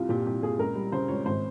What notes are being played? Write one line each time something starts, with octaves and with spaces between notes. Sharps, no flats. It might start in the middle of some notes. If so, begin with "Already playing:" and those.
Already playing: C2 F4
A#2 G4
C2 G4
A#2 G#4
C#2 A#4
G3
C#3 C5
C#2 C#5
G#1 C5